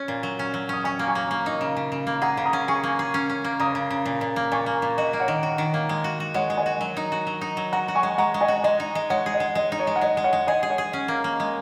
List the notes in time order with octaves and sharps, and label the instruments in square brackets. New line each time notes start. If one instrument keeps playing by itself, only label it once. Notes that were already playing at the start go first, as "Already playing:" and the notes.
Already playing: [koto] C#4 [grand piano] C#5
[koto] A#2
F#3
C#4
F#3
[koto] C#4 [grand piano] D#6
[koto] C#4 [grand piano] G#5 C#6
[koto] A#3
[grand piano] G#5 C#6
[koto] A#3
A#3
D#4
C#3
C#3
C#3
A#3
[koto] G#4 [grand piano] F#5 A#5
[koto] C#3
[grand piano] A#5 D#6
[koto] C#4
[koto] G#4 [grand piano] G#5 C#6
[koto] A#3
G#4
C#4
C#4
A#3
[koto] C#3 [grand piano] A#5 D#6
[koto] C#3
C#3
A#2
A#2
A#3
[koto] A#2 [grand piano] G#5 C#6
[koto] A#3
A#2
[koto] F#4 [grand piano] D#5
[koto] A#3
[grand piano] C#5 F#5
[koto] D#3
F#4
D#3
A#3
G#3
F#4
F#4
[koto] G#3 [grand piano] C#5 F#5
[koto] G#3
[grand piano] D#5 G#5
[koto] F#4
F#3
D#4
F#4
F#3
D#4
F#3
[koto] F#4 [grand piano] F#5 A#5
[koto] F#4
[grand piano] G#5 C#6
[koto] G#3
[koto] G#3 [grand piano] F#5 A#5
[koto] G#3
[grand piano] D#5 G#5
[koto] F#4
[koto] G#3 [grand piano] D#5
[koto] D#4
G#3
[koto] G#3 [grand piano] C#5 F#5
[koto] G#4
[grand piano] D#5
[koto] G#3
[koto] G#3 [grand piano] D#5
[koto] D#4
[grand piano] C#5
[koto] G#3
[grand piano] F#5
[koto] G#3 [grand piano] D#5
[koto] G#3
[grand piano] C#5 F#5
[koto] G#3
[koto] G#4 [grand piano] D#5 G#5
[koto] G#4
[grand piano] C#5 F#5
[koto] G#4
C#4
A#3
A#3
G#3